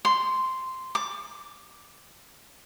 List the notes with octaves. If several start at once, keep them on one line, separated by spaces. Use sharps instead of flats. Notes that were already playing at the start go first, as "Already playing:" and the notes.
C6
D6